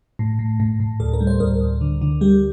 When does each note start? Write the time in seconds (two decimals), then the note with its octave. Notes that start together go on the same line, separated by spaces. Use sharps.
0.19 A2
0.39 A2
0.60 A2
0.80 A2
1.00 D2 A4
1.13 A#4
1.21 G3
1.27 C5
1.40 D2 A#4
1.61 D2
1.81 D3
2.01 D3
2.21 G3 G4